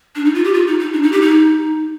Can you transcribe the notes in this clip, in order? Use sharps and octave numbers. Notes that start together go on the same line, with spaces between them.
D4
D#4
F4
G4
F4
D#4
D#4
D4
D#4
G4
D#4